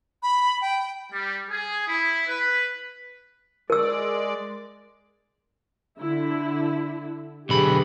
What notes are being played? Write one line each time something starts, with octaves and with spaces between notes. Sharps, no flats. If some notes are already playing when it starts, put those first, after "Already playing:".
B5
G5
G3
G#4
E4
B4
G#3 A#4 D5 E6
D3 E4
B1 D3 G4 G#4 B4 B5